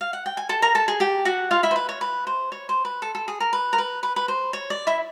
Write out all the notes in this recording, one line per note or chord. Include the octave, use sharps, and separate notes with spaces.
F5
F#5
G5
G#5
A4 A5
A#4 A#5
A4 A5
G#4 G#5
G4 G5
F#4 F#5
F4 F5
E4 E5
C5
B4
C#5
B4
C5
C#5
C5
B4
A4
A4
G#4
A#4
B4
A#4
B4
B4
B4
C5
C#5
D5
E4 E5